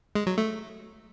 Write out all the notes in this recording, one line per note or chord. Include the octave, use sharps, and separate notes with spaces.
G#3
F#3
A3